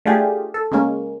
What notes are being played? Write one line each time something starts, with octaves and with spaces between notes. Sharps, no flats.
A3 D4 F4 G4 G#4
A4
C#3 G#3 A#3 C#4